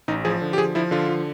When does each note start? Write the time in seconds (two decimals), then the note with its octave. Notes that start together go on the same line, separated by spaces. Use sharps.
0.08 A1 D#4
0.25 F3 G#4
0.42 D3
0.53 G4
0.58 F3 G#4
0.75 F3 E4
0.91 D3 F4
1.09 F3